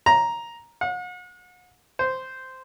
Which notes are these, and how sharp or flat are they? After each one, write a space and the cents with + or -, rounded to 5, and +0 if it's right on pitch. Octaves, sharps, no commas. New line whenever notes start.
A#5 +5
F#5 -40
C5 -10